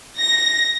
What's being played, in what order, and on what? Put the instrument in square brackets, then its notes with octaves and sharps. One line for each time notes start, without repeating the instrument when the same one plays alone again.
[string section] A#6